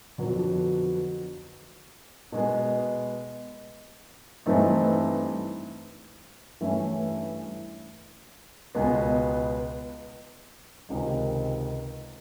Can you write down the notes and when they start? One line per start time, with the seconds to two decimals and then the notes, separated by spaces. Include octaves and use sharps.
0.18 F2 D3 F#3 B3
2.32 B2 G#3 B3
4.46 G2 E3 A3 C4 D#4
6.61 G2 E3 A3 C#4 E4
8.75 C#2 B2 G#3 B3
10.89 C#2 C3 D#3 G#3